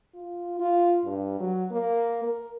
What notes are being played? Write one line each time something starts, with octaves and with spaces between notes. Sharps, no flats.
F4
F4
G2
F#3
A#3
A#4